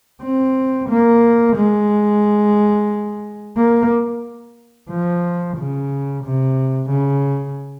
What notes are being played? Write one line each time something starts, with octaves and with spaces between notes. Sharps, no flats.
C4
A#3
G#3
A#3
F3
C#3
C3
C#3